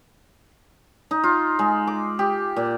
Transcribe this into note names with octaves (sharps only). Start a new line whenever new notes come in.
D#4
F4
G#3
D6
G4
A#2